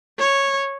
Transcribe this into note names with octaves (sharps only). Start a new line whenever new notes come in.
C#5